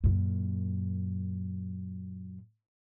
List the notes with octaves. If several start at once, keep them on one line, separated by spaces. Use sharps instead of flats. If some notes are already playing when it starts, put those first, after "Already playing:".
F#2 A#2